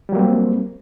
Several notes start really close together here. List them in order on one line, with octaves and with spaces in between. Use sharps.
G3 F#3 A#3 C4